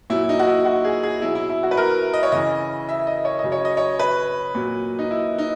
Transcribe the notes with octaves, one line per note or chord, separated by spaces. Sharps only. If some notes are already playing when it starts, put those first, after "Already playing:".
A#2 F#3 E4
D#4
F#4
E4
F#4
G#4
G#4
B2 F#3 E4
E4
E4
F#4
B4
A#4
D#5
C#5
C#3 E3 D#5
E5
D#5
C#5
D#5
C#3 F#3
C#5
D#5
C#5
B4
A#2 F#3
D#4
E4
D#4